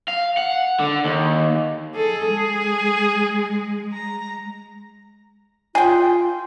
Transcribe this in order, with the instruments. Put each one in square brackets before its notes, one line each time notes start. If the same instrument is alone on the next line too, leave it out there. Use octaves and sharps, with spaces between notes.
[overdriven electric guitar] F5
F#5
D3
D#2
[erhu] G#4 [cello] A4
[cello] G#3
[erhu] A#5
[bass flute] F4 [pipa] G#4 G5